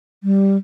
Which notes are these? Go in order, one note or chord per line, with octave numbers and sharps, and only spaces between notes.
G3